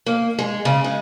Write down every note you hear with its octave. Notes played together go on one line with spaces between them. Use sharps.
A#3
G#3
C#3
G#3